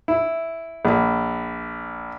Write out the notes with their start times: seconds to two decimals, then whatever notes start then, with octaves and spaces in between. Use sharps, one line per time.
0.08 E4
0.85 A#1